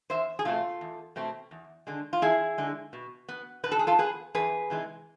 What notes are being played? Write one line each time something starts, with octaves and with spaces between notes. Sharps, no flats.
E2 C5 E5
G#4
B2 A3 C4 F4 A4
E2
B2 A3 C4
E2
D3 G#3
F4
E2 E4 G#4
D3 G#3
B2
B3
B2 B4
A4
G#4
F4 A4
B3 G#4 B4
E2 G#4 B4
C3 E3 G#3